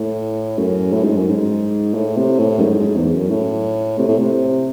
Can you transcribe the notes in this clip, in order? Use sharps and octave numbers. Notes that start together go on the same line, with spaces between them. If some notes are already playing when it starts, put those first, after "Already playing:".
Already playing: A2
F#2
A2
G#2
F#2
G#2
A2
C3
A2
F#2
G#2
G#2
E2
F#2
A2
C3
A2
C3